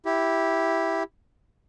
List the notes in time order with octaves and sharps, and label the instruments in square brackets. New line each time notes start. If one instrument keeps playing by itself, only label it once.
[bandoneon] E4 G4